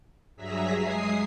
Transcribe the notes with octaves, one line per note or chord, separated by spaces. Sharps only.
G2 F#3 G#4 E5 A#5 B6
G#3 G#5 D#6 C7